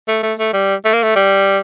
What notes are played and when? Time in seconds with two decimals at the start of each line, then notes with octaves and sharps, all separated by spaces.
0.08 A3
0.23 A3
0.39 A3
0.53 G3
0.85 A3
0.94 A#3
1.03 A3
1.16 G3